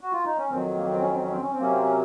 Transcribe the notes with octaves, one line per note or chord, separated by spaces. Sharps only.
F#4
F4
D#4
C#4
F2 D#3 F#3 C4
A#3
C4
C#4
C4
C#4
C4
C#4
C4
C3 F#3 A#3 C#4
C4
C#4